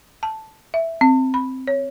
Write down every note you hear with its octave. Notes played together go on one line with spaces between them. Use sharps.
A5
E5
C4
B5
C#5